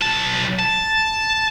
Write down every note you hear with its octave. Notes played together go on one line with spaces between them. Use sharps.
B1 A5
A5